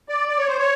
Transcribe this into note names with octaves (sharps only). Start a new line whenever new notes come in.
D5
D5
C#5
C5
C#5